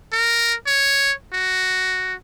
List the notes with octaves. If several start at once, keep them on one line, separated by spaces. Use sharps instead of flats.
A#4
C#5
F#4